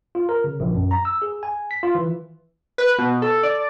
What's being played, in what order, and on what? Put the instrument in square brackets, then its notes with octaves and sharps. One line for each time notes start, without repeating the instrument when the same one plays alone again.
[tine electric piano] F4
A#4
C#3
A#1
F#2
A#5
E6
G#4
G#5
B6
F4
E3
[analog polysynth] B4
B2
A4
D5